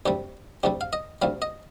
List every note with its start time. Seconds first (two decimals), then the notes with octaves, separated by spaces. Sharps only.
0.06 D2 C3 G3 G4
0.63 D2 C3 G3 G4
0.81 F5
0.93 D#5
1.22 D2 C3 G3 F5
1.42 D#5